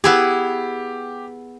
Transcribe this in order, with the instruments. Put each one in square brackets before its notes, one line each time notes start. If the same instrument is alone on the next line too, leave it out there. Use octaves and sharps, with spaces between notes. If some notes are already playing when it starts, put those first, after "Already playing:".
[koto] B3 E4 G#4 [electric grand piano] G4